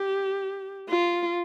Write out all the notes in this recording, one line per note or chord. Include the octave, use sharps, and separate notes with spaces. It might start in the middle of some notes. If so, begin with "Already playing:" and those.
Already playing: G4
F4